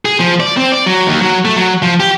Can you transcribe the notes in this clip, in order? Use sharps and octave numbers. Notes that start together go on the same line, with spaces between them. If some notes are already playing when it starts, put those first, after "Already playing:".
G#4
F3
D5
C4
D5
F#3
D#2
F#3
A3
F#3
F3
G4